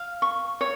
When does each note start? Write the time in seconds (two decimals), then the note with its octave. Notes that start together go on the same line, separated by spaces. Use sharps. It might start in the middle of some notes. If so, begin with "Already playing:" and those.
Already playing: F5
0.22 C#6
0.61 C#5